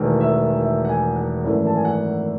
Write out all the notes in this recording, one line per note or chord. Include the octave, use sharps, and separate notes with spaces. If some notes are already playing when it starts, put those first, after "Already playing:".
Already playing: E1 E2 D#3 A3
E5
E5
F#5
G#5
F#5
G#1 F#2 E3 A3
A5
G#5
F#5